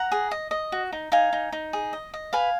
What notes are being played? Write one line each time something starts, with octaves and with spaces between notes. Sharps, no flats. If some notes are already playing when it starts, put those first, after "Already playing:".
Already playing: F#5 A#5
G#4
D#5
D#5
F#4
D#4
D#4 F5 G#5
D#4
D#4
G#4
D#5
D#5
B4 F5 G#5